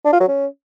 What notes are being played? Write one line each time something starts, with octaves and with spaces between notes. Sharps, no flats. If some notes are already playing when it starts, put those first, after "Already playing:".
D4
F4
F#3
C#4